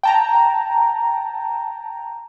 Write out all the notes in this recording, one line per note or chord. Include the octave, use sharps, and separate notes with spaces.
G5 A5 A#5